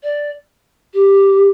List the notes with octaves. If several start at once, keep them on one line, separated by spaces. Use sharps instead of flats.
D5
G4